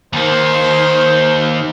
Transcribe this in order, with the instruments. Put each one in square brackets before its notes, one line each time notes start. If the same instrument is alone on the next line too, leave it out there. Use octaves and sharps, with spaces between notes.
[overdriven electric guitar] D#2 D#3 [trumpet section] C5